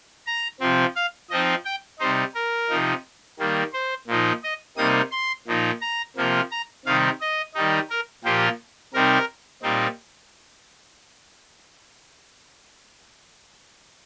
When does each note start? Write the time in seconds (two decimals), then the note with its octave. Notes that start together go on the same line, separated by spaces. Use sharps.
0.27 A#5
0.60 C3 F3 C4
0.96 F5
1.30 F3 C4 D#4 D#5
1.65 G5
1.99 C3 G3 D#4 C5
2.35 A#4
2.70 C3 F3 D#4
3.39 D#3 G3 A#3
3.73 C5
4.07 A#2 F3 D#4
4.43 D#5
4.77 C3 G3 A#3 D#4 D#6
5.12 C6
5.47 A#2 F3 D#4
5.81 A#5
6.16 C3 F3 A#3 F4
6.51 A#5
6.85 C3 D#3 G3 D#4 F5
7.21 D#5
7.55 D#3 G3 D#4
7.90 A#4
8.24 A#2 F3 A#3 F4 G4
8.94 C3 G3 C4 D#4 A#4
9.63 A#2 G3 C4 D#4